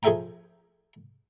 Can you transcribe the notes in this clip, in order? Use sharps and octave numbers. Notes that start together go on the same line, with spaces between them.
F3 G#4 A4 E5 G5 A#5